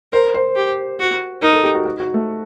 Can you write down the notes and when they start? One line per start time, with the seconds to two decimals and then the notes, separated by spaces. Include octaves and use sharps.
0.13 A#4 C5
0.34 C5
0.56 G4
1.00 F#4
1.42 D#4 A#4
1.53 A4
1.64 G4
1.75 F#4
1.85 F#4
2.00 F#4
2.14 A3